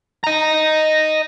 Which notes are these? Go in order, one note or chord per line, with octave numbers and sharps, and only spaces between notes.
D#5 A#5